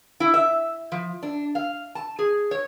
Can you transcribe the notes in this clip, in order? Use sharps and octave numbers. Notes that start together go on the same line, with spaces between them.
E4
E5
F3
D4
F5
A5
G#4
C#5